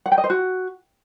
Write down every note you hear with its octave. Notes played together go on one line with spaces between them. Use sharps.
F#5
G5
D#5
C5
F#4